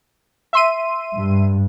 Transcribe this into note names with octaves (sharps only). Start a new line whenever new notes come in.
E5 C6 D#7
G2